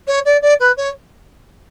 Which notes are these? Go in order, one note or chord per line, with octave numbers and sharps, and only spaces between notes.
C#5
D5
D5
B4
C#5